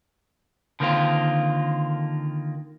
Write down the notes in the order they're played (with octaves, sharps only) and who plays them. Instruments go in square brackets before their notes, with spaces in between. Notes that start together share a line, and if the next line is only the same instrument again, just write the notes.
[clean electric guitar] D3 D#3 A#3 C4 F4